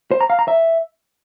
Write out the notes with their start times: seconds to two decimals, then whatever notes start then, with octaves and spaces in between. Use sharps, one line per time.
0.11 C5
0.21 A#5
0.30 F5
0.39 A#5
0.48 E5